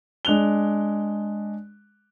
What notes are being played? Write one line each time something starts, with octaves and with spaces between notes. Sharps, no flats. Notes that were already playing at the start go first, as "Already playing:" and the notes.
G#3 D4 F#6 F7 G7